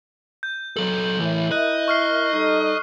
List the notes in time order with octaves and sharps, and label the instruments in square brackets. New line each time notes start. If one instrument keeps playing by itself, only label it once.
[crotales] G6
[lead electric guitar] F#3 A4 [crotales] F#7
[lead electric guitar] A2 E3 [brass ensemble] E4 A#4 E5
[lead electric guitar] D#5 [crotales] F#6
[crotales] C#6 F6 C7
[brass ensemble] G3 D#4 A4